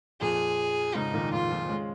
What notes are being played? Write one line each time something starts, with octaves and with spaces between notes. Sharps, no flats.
F2 A#2 G#4
G#2 C#3 D#4
A#2 D#3
F2 A#2 F4
F2 A#2
G#3 C#4